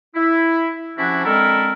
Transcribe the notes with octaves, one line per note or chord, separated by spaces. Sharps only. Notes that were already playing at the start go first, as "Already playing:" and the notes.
E4
C3 F3 C#4 D4 E4 F#4
D3 G#3 C4 E4 A4 A#4